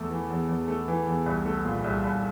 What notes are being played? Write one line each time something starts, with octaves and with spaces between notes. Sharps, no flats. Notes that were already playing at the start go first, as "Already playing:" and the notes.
Already playing: E2 A3
E3
E2
E2
A3
E3
E2
C2
A3
A#2
C2
C2